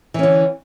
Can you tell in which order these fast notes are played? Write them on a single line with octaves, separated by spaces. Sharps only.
E3 C#4 D3